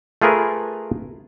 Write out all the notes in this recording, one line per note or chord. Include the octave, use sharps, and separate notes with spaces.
A3 F4 G#4 A#4 B4